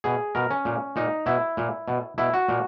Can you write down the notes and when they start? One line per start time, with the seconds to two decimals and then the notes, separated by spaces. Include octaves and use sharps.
0.04 B2 G#4
0.35 B2 A#4
0.50 C#4
0.65 A#2
0.96 A#2 D#4
1.26 B2 E4
1.57 A#2
1.88 B2
2.18 B2 E4
2.34 F#4
2.48 A#2